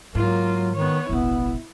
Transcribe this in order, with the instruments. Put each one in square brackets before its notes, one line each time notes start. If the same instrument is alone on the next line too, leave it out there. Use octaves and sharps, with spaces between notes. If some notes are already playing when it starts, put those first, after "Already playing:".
[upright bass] G#2 [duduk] F#3 [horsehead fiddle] A#3 F4
[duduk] D#3 [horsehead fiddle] B3 C#5
[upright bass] E1 A1 [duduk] B3 [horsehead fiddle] E4